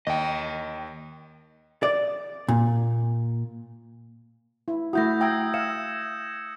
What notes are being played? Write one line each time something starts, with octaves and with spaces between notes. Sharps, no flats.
D#2 D#5 G5
D5
A#2
E4
A3 E4 F#4 D#6 G6 A#6
G5 A#5 D#6 E6 G#6
E5 F5 C#7 E7